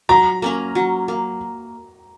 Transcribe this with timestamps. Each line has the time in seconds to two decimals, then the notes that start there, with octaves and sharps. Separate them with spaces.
0.09 F#3 A#5
0.42 A#3 C#4 A#4
0.75 F#3
1.08 A#3